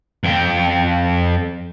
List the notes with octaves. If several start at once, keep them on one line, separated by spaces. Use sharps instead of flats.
F2 G5